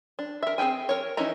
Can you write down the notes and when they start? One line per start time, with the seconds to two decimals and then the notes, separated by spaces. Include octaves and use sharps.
0.19 D4
0.43 A#4 E5
0.58 C4 G#4 D#5 G5 G#5
0.89 A#4 C#5
1.17 E3 C#4 D#4 E4 A#5